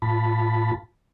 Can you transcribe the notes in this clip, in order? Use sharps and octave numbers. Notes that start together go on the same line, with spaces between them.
A2 F4 A5 B5